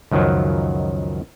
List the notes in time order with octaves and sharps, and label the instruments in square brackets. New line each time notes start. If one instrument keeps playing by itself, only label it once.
[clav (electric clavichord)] C#2 F#2 D#3 F3 F#3